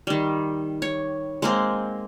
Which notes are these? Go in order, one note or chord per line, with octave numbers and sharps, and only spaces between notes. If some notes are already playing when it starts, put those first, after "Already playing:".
D#3 G3
C#5
G#3 A#3 C4